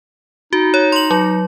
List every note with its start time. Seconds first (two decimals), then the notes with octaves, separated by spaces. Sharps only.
0.53 D#4 F#4
0.74 C#5
0.92 C6 F#7
1.11 F#3